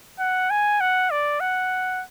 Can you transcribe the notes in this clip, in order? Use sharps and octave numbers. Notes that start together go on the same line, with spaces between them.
F#5
G#5
F#5
D5
F#5